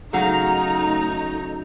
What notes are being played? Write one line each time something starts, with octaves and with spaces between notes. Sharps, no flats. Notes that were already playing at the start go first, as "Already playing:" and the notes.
C#3 F#3 A3 D#4 F5 A#5